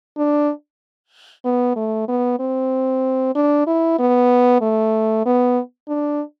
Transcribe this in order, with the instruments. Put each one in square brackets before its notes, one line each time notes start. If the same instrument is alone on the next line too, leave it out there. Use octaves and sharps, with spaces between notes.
[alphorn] D4
B3
A3
B3
C4
D4
E4
B3
A3
B3
D4